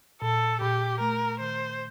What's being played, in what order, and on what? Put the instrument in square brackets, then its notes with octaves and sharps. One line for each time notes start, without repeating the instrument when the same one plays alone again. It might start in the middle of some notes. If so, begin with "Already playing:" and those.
[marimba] A#2 [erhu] A4
[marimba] A#2 [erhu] G4
[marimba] A3 [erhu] A#4
[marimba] D#3 [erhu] C5